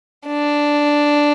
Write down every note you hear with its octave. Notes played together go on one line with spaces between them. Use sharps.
D4